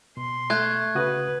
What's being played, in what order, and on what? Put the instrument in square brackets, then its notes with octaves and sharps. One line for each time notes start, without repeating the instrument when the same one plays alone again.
[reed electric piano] B2 [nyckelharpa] C6
[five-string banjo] A3 [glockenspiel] F#6 G#6
[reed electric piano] C#3 F#4 D#6 [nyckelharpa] B4